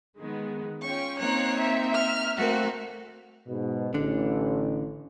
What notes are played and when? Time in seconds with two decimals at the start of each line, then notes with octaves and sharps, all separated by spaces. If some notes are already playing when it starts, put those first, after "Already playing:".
0.18 D#3 G#3 B3
0.82 C#4 F4 G5 C#6
1.19 A#3 C4 D#4 C#5 F5 F#6
1.55 E5
1.94 F6
2.37 A3 A#3 C4 F#4
3.48 G#2 B2
3.94 A1 D3 D4